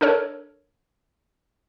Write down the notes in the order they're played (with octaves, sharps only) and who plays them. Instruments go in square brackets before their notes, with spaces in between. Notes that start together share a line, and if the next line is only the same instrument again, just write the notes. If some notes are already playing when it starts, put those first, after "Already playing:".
[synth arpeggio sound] D4 A4 A#4 C#5